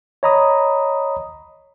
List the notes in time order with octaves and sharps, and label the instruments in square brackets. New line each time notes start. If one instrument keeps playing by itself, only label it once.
[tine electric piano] C#5 D#5 A#5 B5 D#6